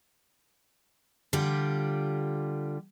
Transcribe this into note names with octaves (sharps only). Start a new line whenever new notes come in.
D3 G3 F4 G4